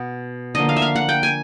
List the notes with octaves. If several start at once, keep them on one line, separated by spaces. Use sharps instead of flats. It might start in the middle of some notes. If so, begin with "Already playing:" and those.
Already playing: B2 B3
D3 F3 A#3 D#5
F5
E5
F5
F#5
G5
G#5